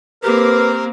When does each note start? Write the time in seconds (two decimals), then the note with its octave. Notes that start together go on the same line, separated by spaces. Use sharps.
0.23 A#3 C4 G4 A#4 B4